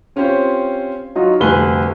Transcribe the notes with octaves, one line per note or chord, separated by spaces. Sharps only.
C4 C#4 F4 G4 C5 C#5
F#3 D#4 F4 F#4
F1 D2 G3 B4 G#5 G7